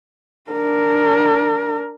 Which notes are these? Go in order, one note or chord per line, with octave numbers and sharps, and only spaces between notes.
D4 A#4